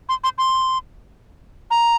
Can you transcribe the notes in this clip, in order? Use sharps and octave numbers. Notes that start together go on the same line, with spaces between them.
C6
C6
C6
A#5